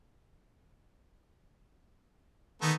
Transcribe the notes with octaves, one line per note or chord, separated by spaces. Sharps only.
D#3 A3 B3 D#4